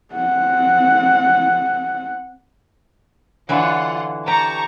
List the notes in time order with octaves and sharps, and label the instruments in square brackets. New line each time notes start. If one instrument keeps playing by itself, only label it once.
[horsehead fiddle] C4 F#5
[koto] D3 E3 F#3 [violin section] F4 F#5
[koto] G4 [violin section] A5 A#5 C#6